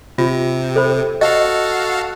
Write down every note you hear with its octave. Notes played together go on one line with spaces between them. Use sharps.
C3 F4
A4 C5 B5
F#4 A4 D#5 F5